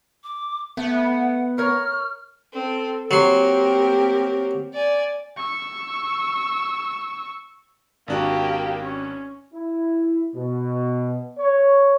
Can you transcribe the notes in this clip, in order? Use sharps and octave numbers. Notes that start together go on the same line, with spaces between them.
D6
A3 B3 F#5
A#4 C#5 F6
C4 A4
F#3 A#3 C4 G4 A#4 C6
D5 G#5
C#6 E6
G#1 A#3 D4 F#4 G4
C#4
E4
B2
C#5